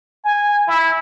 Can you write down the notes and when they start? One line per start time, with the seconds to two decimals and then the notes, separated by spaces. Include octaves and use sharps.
0.24 G#5
0.67 E4